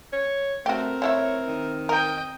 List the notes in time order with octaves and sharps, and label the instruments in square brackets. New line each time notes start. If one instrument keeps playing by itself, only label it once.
[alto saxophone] C#5
[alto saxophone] A3 [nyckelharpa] C4 A#4 [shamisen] F#4 G4
[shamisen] A3 E4 E5 [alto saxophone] C#5
[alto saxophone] D#3
[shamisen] A#4 [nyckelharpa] D#5 G5